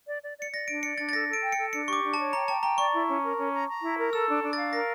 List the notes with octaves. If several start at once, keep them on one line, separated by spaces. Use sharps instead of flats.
D5
D5
D5 C#7
D5 A#6
D4 D7
D5 C#7
D4 A6
A6
A4 A#6
A4 D7
G5
C#7
A4
D4 C#7
G4 C#6 D6
D4
C#5 A5
G5 A#5
G5 A5
G5 A#5
D5 C#6
E4
C#4
A#4
C#4
A#5
A#5
E4
A#4
A4 E6
D4
D4
F5 A6
A#4 A#6